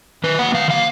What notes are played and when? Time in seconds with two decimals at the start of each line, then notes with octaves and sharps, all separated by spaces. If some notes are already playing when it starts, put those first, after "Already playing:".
0.24 D#3 B4
0.39 F#3 A#3 F#5
0.54 D#3 F5
0.70 F#3 A#3 F5